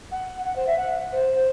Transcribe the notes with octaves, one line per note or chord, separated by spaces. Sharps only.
F#5
F#5
C5
E5
F#5
C5